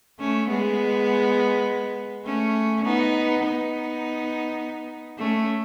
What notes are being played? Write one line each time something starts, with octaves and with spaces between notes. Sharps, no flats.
A3 C#4
G#3 B3
A3 C#4
B3 D#4
B3 D#4
A3 C#4